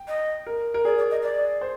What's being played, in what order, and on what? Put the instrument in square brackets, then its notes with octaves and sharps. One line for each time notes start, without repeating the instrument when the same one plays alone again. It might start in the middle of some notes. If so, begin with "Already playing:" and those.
Already playing: [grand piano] G5
[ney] D#5
[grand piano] A#4
A#4
[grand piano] G#4 [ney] D5
[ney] D5
D#5
D5
[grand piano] C5